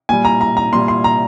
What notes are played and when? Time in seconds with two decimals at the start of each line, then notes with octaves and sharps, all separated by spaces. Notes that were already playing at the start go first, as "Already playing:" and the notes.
0.09 A#2 G3 G#5
0.25 A#5
0.41 A#5
0.57 A#5
0.73 A#2 G3 C6
0.88 C6
1.04 A#5